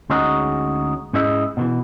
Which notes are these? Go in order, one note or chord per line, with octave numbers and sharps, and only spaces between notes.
D2 G#3 C#4 D#4 F#4 G#4
G#2 C#4 E4 G#4 D#5 E5
B2 D#3 E3